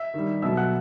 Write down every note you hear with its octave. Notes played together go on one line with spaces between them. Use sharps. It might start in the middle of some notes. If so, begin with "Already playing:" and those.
Already playing: E5 E6
D#3 G3
B2 F#3 A3 E5 E6
F#5 F#6